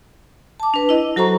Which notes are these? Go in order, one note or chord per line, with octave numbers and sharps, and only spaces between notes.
A5 D6
D4 B4
E4 D#5
F#3 F#4 A4 C5 A#5 C#6